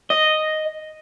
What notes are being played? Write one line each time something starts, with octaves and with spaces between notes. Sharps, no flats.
D#5